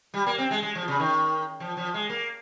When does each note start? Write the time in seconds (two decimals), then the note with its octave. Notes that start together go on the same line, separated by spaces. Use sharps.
0.14 G3
0.26 A#3
0.38 C4
0.51 G#3
0.62 G#3
0.75 F3
0.88 C#3
1.00 D#3
1.60 F3
1.77 F3
1.94 G#3
2.09 A#3